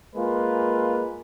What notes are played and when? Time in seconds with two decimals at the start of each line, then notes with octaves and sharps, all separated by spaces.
0.15 G#3 A#3 F4 B4